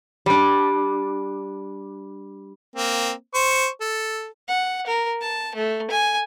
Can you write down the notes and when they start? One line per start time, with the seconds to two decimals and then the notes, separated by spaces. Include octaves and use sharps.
0.26 G3 D4
2.76 A#3 C4
3.34 C5 C#6
3.81 A4
4.48 F#5
4.87 A#4
5.21 A5
5.55 A3
5.90 G#5